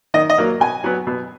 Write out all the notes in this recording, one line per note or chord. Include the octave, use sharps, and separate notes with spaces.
D#3 D#5
D#5
F#3 A#3
B2 G#5
F#3 B3
B2